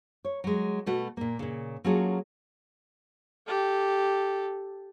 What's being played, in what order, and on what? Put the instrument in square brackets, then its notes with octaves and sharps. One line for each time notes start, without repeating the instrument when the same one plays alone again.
[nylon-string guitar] C#5
F#3 G#3
B2 A3 F#4
A#2 A#3
A#2 C#3
F#3 A#3 C#4 F4 G#4 A4
[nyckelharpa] G4 A4